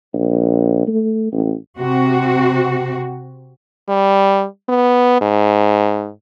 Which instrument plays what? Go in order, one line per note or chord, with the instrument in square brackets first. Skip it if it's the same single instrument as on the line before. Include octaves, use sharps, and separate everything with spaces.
[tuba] A#1
A3
A1
[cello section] C3 C4 F#4
[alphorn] G3
B3
G#2